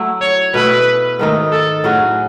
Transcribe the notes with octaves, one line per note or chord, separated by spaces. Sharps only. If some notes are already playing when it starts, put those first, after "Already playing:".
Already playing: F#3 A3 E4
C#5
B2 A3 E4 B4
G#2 D#3 A3 D#4
A4
A2 F#3 C#4 F#4 G#4